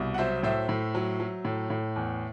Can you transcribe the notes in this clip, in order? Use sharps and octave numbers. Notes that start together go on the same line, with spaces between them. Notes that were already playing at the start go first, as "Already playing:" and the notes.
Already playing: C2 B2
F#5
F#3 C5 E5
A2 C5 E5
A2
F#3
F#3
A2
A2
E2